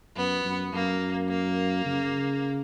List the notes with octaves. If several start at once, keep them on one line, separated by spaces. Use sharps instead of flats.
F#2 B3
F#2
F#2 A#3
A#3
C#3